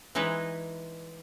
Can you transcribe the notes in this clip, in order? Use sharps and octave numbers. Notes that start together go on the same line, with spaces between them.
E3 G#3 D#4 E4 B4